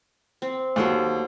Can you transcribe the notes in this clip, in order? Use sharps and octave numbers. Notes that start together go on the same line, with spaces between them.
C4
D#2 F#3 A4 C5